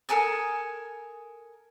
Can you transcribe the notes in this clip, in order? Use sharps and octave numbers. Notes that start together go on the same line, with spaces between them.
A4 A#4 G#5 D#6